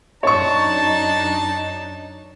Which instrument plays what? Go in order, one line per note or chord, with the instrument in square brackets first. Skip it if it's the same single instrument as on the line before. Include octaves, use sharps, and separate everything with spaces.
[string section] F#2 D4 D#4 [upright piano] C#5 C#6 [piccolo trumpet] A5